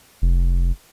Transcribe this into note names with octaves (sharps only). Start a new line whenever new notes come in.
F1